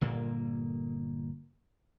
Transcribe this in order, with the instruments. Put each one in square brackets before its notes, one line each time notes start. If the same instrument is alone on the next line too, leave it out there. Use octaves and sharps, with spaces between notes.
[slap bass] G1 A#2 A#3